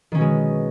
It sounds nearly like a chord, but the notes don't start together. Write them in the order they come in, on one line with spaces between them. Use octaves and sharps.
D#3 C#4 B2 G#3